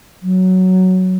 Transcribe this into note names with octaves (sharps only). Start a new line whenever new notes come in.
F#3